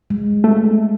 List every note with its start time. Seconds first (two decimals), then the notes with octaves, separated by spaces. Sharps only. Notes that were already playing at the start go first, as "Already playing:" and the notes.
0.10 G#3
0.44 A3